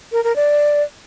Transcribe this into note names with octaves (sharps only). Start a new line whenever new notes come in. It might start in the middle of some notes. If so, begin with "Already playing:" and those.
A#4
A#4
D5